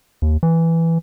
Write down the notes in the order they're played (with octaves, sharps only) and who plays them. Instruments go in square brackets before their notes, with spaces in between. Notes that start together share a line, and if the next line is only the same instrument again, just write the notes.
[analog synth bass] D#2
E3